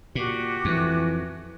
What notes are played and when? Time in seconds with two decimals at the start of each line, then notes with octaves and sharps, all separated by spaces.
0.15 A#2 F#4 G4 D6
0.65 F2 E3